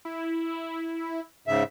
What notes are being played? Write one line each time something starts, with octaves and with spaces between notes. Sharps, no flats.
E4
G#2 C#3 E5